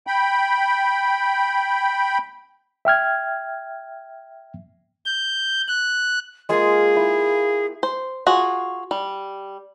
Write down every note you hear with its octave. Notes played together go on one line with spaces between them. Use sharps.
G5 B5
E5 G5 F6 G#6
G6
F#6
G#3 A#3 F4 G#4
E4 G5
C5
F4 F#4 G#4
G3